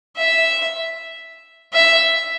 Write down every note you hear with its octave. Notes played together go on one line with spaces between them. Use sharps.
E5
E5